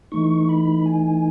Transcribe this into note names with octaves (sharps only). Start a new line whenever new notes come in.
E3 A3 D#4 C#6
B5
G#5